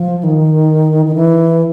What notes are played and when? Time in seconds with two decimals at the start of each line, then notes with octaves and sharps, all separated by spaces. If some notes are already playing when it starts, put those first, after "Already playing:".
Already playing: F3
0.23 D#3
1.06 D#3
1.15 E3